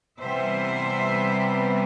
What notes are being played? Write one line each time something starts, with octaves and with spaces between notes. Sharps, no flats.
C3 E3 G3 B3 C5 E5